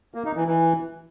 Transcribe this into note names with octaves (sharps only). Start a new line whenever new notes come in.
A#3
D#4
E3
E3